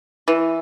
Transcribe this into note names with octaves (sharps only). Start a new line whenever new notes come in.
E3